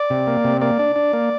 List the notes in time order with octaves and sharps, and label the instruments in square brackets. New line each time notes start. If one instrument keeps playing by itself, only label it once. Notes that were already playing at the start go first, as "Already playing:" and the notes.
Already playing: [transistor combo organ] D5
C3
A#3
C3
A#3 D5
D4
D4
A#3